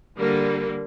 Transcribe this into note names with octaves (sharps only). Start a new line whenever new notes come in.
D3 G3 A#3